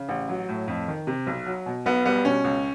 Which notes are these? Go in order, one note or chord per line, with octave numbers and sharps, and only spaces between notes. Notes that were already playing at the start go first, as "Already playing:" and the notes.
Already playing: C#3
A1
F#3
A2
F2
D#3
C3
B1
F#3
B2
B1 B3
G3 B3
B2 C#4
C#2